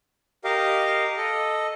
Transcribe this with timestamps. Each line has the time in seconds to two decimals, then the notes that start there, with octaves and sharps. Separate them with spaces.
0.44 G4 A#4 D#5 F5
1.17 A4 D#5